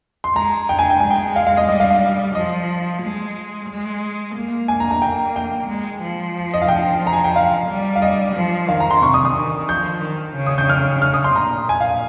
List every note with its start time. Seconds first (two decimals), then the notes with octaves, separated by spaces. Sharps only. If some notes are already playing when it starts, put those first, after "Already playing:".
0.24 C6
0.35 G#3 A#5
0.69 G5
0.79 G#5
0.90 G5
1.00 G#3 G#5
1.10 G5
1.36 F5
1.47 F5
1.57 D#5
1.69 G3 D#5
1.80 F5
1.91 F5
2.35 F3 D#5
3.02 G#3
3.69 G#3
4.35 A#3
4.68 G#5
4.80 A#5
4.91 A#5
5.02 A#3 G5
5.36 G5
5.68 G#3
6.02 F3
6.54 D#5
6.62 F5
6.68 F3 G5
7.07 A#5
7.13 G#5
7.24 G5
7.36 F5
7.69 G3
7.96 F5
8.02 D#5
8.36 F3
8.69 D#3 F5
8.80 A#5
8.91 C6
9.02 C3 C#6
9.14 D#6
9.25 D#6
9.35 D#3
9.68 F3 G6
10.02 D#3
10.36 C#3
10.46 D#6
10.58 G6
10.69 F6
11.02 F6
11.14 D#6
11.24 C6
11.36 A#2 A#5
11.69 G#5
11.81 F5